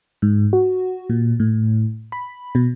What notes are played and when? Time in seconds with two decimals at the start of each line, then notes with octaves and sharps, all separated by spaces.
0.22 G#2
0.53 F#4
1.10 A#2
1.40 A2
2.12 B5
2.55 B2